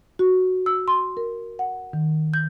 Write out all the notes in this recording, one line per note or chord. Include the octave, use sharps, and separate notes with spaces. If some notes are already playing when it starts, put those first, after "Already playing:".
F#4
E6
C6
A#4
F#5
D#3
G6